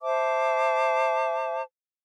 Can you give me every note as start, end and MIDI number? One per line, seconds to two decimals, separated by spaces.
0.01 1.62 72
0.01 1.62 76
0.01 1.62 81
0.01 1.62 86